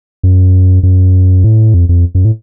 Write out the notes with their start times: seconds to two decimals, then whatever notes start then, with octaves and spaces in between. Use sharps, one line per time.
0.23 F#2
0.83 F#2
1.44 A2
1.74 F2
1.89 F2
2.15 F#2
2.25 A2